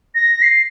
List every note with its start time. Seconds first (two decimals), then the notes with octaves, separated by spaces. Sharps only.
0.14 A#6
0.42 C7